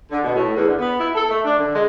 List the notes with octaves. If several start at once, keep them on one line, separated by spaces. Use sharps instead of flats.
D3
B2
A2
E2
D3
B3
E4
A4
A3
D4
D3
G#3